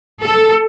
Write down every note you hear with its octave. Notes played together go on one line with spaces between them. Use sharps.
A4